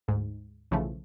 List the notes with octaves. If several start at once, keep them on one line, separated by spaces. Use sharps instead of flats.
D2 G#2
B1 C#3 E3 F3 A3